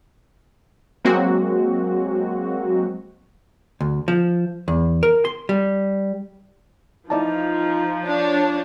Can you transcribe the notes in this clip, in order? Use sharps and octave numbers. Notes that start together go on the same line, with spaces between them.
F#3 G#3 A#3 C4 F#4
D2
F3
E2
A#4
C6
G3
F3 D#4 E4 D5 A5
D4 C#5